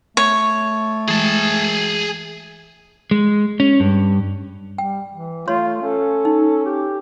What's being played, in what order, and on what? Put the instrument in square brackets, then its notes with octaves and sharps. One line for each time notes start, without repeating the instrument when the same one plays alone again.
[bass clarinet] A3 [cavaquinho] C#5
[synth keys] E3 G#3 [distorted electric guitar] G#4 A5
[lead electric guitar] G#3
C#4
G2
[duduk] G3 [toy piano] G5
[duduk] E3
[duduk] A3 [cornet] F4 [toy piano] C#5 C6
[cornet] C#4 [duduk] A4
[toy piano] D#4
[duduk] G4